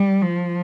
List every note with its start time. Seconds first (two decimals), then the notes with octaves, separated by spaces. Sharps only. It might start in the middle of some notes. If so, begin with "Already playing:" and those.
Already playing: G3
0.22 F3